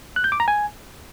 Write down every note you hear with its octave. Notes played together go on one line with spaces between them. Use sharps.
F#6
G6
D6
A#5
G#5